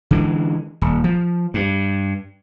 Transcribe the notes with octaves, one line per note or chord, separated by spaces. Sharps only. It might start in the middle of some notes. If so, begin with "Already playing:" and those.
D3 E3 G#3
D#1
F3
G2